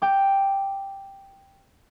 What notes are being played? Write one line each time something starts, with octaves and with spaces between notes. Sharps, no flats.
G5 D6